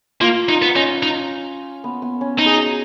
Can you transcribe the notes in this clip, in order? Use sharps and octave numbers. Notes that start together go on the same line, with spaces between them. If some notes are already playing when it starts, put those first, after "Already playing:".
A#3 F4
D#4
B3
C#4 D#4
D#4
B3
B3
C#4
D#4
G#4
F#4